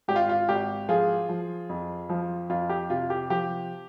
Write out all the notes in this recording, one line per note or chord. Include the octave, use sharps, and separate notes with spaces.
G#1 G4
F4
F4
G#1 G4
F3 F4 G#4
F3
F2
F3
F2 F4
G4
C3 F4
G4
F3 G4